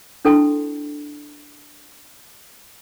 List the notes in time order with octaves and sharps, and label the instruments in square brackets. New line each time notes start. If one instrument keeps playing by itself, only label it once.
[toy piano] D4 E4 A4 G5 A5 C6